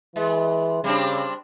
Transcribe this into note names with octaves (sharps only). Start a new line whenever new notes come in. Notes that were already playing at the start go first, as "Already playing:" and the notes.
E3 G#3
C#3 G3 C4 D4